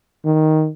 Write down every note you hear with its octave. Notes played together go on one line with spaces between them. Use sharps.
D#3